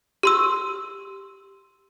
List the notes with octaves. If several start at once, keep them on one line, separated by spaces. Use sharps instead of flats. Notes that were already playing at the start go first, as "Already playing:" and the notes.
G4 C6 E6